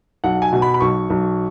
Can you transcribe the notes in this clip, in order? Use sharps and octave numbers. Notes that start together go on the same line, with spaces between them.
B1 F#5
G#5
B2
B5
B5
B1 C#6
B1